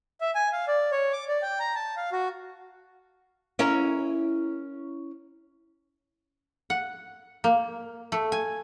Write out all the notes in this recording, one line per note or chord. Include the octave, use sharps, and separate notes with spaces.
E5
G#5
F5
D5
C#5
D6
D5
G5
A#5
A5
F5
F#4
C#4 E4 A#4
F#5
A#3
A3
G#5